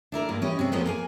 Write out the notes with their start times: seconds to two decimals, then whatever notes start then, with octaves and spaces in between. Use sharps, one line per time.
0.12 D4 E4 A#4 D5
0.29 G2 G#3 A#3
0.41 E3 G3 C#4 G4 C#5 D#5
0.59 C3 F#3 G#3
0.72 F2 F3 A#3 B3 C#4
0.86 A#3 G#4 G#5